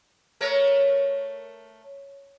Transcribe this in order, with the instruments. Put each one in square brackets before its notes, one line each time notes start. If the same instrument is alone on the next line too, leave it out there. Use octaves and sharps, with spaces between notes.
[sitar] A3 A#4 C#5